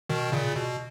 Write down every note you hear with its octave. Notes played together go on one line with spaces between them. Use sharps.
B2 D#3
A#2 C#3
B2